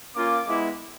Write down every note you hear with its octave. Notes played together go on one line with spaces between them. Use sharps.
A#3 C#4 F4 D6
G#3 B3 E4